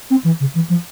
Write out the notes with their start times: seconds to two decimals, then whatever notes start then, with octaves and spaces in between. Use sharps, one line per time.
0.10 C4
0.24 E3
0.40 C#3
0.55 E3
0.69 F3